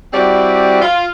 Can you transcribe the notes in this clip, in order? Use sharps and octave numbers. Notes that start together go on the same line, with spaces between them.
G3 C4 E4 F#4 G4 D5
F4